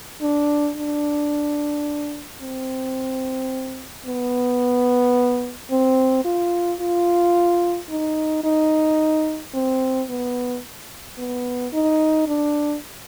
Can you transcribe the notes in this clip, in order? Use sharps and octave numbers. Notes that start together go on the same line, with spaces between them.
D4
D4
C4
B3
C4
F4
F4
D#4
D#4
C4
B3
B3
D#4
D4